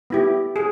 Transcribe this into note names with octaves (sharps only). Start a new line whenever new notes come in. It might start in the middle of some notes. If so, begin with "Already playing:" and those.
B3 E4 G4
G#4